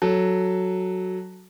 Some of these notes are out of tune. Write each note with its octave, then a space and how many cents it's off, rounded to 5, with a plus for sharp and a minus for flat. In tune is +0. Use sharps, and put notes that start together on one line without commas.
F#3 +0 A4 +0